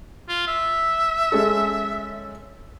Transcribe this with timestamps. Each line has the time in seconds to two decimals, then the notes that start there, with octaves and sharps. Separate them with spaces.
0.28 F4
0.47 E5
1.32 G#3 C#4 A4